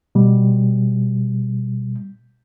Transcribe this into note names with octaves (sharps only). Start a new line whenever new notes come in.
B2 G3